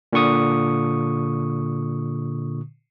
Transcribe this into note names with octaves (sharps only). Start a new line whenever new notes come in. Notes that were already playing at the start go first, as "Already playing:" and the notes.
A#2 D3 C#6 D#6